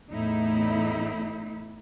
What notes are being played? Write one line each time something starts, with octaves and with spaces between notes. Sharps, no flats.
E2 A2 D#4 E4